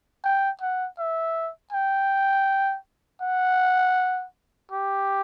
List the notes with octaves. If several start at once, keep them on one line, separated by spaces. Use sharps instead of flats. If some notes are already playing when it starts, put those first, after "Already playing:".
G5
F#5
E5
G5
F#5
G4